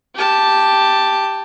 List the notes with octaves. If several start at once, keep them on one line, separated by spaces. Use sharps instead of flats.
G4 A5